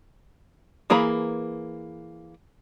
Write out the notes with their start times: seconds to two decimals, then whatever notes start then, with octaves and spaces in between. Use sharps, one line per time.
0.90 E3 A#3 G#4 A#5 B5